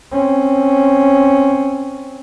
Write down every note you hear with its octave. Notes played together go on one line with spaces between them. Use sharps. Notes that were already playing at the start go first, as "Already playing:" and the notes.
C4 C#4